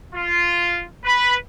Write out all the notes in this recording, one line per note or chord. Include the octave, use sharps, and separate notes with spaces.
F4
B4